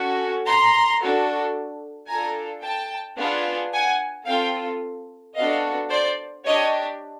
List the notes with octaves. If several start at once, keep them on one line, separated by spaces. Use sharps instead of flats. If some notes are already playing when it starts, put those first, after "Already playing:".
Already playing: C#4 F#4 A4
A#5 C6
D4 F#4 A4
D4 F4 A4 G#5 A#5
G5 A5
B3 D4 F4 G#4
F#5 G#5
C4 F4 A4 F5 G5
B3 D4 F#4 A4 D#5 F5
C5 D5
D4 G4 C#5 D#5